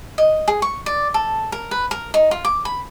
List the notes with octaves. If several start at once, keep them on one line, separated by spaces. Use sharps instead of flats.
D#5
G#4
C#6
D5
A4
A#4
B4
A#4
D#4
F4
D6
B5